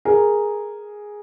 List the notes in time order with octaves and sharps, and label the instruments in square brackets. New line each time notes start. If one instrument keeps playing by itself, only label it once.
[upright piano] G#4 A#4